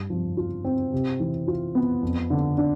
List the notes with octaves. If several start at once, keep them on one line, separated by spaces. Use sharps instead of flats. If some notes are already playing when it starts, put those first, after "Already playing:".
Already playing: G2
F3
F4
C4
C3
E3
F4
B3
F2
D3
D4